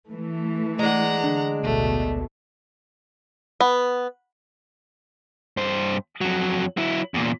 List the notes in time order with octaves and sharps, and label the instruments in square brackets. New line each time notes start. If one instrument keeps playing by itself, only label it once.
[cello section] E3 A3
[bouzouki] G#3 D4 [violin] F#5 A#5
[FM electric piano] D3
[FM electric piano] A1 D2 [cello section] B2 [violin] A3
[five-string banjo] B3
[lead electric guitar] G2 C5
F2 F#3
F#3 E4
E2 A#2